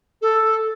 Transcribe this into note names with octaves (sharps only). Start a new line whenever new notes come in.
A4